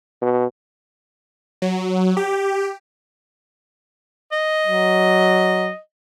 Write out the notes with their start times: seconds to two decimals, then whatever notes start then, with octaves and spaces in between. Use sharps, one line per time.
0.22 B2
1.62 F#3
2.17 G4
4.32 D#5
4.67 F#3